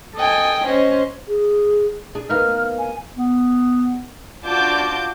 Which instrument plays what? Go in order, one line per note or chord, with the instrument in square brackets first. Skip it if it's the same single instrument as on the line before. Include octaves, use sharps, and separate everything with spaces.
[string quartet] A4 D#5 G5 G#5
C#4 C5 D#5
[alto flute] G#4
[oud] D4 G#4
[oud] A#3 B3 D#4 [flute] F6
[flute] G#5
[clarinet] B3
[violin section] D4 F4 F#4 A5 D6 G6